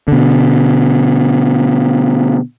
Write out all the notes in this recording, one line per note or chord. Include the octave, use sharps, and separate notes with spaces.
B2 D3